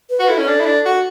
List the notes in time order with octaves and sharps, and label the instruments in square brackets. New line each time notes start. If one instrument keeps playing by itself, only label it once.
[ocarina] B4
[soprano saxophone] F#4
[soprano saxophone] E4 [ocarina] A4
[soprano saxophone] C#4
[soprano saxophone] D4 [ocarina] A4
[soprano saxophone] E4
D4
F#4